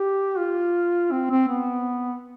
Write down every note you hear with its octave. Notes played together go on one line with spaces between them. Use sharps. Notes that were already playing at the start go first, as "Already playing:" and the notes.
Already playing: G4
F4
C4
C4
B3